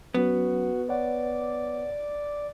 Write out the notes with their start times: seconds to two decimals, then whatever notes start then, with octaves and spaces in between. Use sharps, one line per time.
0.14 F#3 B3 C#4 F#4
0.89 B4 C#5 D5 F#5